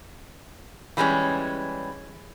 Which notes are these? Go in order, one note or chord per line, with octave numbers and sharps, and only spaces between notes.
E3 G3 G#3 A#3 C#4